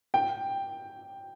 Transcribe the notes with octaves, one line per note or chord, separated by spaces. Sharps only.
G5